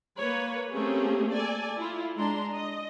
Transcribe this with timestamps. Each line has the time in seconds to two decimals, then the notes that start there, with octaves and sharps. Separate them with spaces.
0.18 A#3 B4 C#5
0.73 A3 A#3 C4 C#4 G4 G#4
1.33 A4 D5 G#5
1.78 E4 F4
2.16 G#3 D4 A#5 C6
2.53 D#5